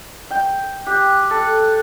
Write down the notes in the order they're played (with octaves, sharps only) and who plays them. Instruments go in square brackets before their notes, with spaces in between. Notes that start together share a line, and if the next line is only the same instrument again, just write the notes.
[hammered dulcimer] G5
[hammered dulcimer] G4 [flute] F#6
[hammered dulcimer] A4